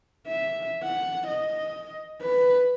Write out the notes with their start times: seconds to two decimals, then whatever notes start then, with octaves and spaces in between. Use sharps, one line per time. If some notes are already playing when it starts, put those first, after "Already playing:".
0.28 E5
0.84 F#5
1.28 D#5
2.22 B4